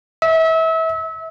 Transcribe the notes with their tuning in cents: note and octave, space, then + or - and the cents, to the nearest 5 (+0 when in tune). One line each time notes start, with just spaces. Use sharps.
E5 -30